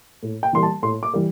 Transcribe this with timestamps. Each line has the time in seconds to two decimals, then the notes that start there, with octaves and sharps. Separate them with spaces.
0.23 A2
0.43 G5
0.53 E3 G3 C6
0.63 A5
0.83 A2 C6
1.03 D6
1.14 E3 G3